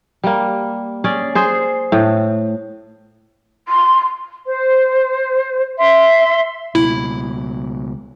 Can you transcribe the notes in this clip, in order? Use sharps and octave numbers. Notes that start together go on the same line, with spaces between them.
G3 A#3
C#4 G#4 D5
G#4 C5
A2
C6
C5
E5 C6
C#2 B2 E4